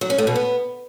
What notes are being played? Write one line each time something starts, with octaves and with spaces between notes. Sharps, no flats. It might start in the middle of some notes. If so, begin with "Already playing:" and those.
F#3
C#4
A3
B2
B3